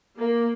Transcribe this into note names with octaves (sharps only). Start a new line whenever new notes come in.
A#3